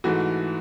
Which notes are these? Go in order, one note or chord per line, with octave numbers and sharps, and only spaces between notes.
G#2 E3 A3 F#4